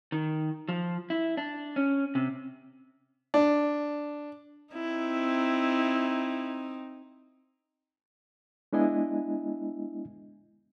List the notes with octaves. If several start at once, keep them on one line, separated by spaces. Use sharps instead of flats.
D#3
F3
E4
D4
C#4
C3
D4
C4 D#4 E4
G#3 B3 D4 E4 D#5 G#5